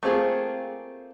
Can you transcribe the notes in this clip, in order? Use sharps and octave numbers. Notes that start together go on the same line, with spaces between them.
A3 A#3 C4 F4 G#4